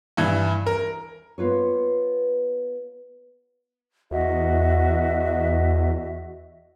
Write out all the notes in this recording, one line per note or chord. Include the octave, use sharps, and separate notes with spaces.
G2 E3
A#4
A#3 B3 F4 B4 C#5
E2 F#4 D#5 E5